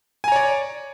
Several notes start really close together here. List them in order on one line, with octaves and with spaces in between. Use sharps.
G#5 A#5 C#5 D5